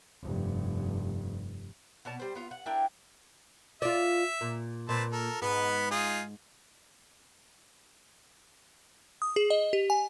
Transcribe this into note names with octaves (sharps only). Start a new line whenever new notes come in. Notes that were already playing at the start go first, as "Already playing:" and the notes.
F1 G2
B2 B3 D5 A5
G3 C5
B3 F4
F#5
D4 E4 A#4 G5
F4 D5 E5
A#2
A#2 C4 B4 A5
A4 A#4
G#2 B3 B4
D#4 F4 G#4
D#6
G#4
D#5
G4
G#5